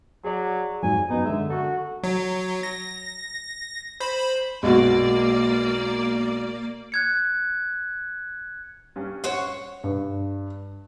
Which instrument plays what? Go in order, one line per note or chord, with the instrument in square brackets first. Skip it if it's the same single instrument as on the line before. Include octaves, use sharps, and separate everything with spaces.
[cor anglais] F#3 [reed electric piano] G#4 D5
[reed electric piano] F2 G#2 F#3 [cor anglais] G#5
[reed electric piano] F#2 B3 [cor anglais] D#4
[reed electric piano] D3 G#3 [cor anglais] E5
[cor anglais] F#4 [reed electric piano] A4
[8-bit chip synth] F#3
A#6
C5 B5
[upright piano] B1 [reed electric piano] G#3 F#4 [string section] A#3 D5
[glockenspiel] F#6 G#6 C#7
[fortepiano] G2 C#4
[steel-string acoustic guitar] C5 C#5 F#5
[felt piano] G2